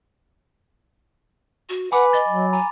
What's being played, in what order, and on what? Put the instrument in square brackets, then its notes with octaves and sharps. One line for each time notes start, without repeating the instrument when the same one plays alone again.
[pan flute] F#4
[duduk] B4 [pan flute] F#5 [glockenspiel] G#5 B5 D6
[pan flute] D#5 [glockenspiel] A6
[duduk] F#3
[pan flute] G#5 [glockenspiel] A#5